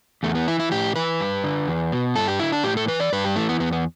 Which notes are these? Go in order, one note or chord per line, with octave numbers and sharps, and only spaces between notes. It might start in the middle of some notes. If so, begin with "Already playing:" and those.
E2 A3
B3
E3 E4
E4
A2 G4
E3 B4
G2
D3
E2
B2
G2 A4
G4
D3 E4
D4
A2 G4
A4
E3 B4
D5
G2 B4
G4
E3 A3
B3
E2 B3
B3